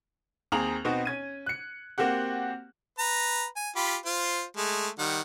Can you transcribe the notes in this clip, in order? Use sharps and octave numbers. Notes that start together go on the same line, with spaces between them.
D#2 C4 G#4 A#5 F7 F#7
B2 B3 C4 D#4 F#4
C#4 G#6 D#7
F#6 C#7
A#3 C4 F#4 G4 F#5
B4 A#5
G#5
F4 G4 B5
F4 C5
G#3 A3
D#3 G3 F#5